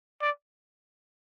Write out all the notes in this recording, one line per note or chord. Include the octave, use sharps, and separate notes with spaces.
D5